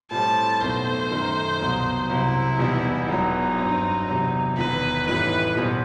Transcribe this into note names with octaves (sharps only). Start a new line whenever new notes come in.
A2 G3 C4 A5
B1 B2 A3 C4 C5
F#2 D#3 A3 D#4
C2 B2 F#3
C2 C3 F#3 C4 E4
E2 B2 G3 D#4
E1 E2 B2 F#3 D#4
G2 F#3 C4
E2 C3 F#3
E1 E2 D#3 F#3 B4
A1 A2 E3 G3 D#4 B4
E2 B2 G3 C4